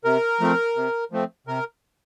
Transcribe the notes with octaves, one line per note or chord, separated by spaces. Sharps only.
C3 A#4
F3 A3 C4
C3
F3 A3 C4
C3 A#4